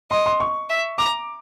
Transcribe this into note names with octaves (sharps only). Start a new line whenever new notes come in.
D#5 C6
C6
C#6
E5
A#5 D6